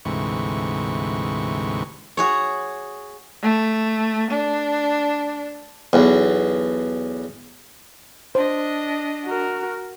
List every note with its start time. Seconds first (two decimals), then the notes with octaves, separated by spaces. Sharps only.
0.05 D2 G#2 C3 E3 C#6
2.17 F#4 G#4 C#5
3.42 A3
4.31 D4
5.93 B1 E2
8.35 D4 C5 D#5
9.26 F#4 A#4